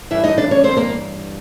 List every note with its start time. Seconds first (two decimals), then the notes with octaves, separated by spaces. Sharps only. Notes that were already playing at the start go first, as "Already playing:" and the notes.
0.11 G2 E3 G3 E4 E5
0.24 D#4 D#5
0.38 D4 D5
0.51 C#4 C#5
0.64 C4 C5
0.77 A#3 A#4